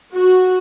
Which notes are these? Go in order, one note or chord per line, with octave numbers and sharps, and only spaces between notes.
F#4